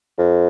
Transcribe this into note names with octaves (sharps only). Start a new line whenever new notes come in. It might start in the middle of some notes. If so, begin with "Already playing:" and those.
F2